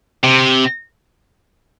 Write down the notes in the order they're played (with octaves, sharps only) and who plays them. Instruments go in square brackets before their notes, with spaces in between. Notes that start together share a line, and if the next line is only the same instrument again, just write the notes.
[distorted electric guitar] C3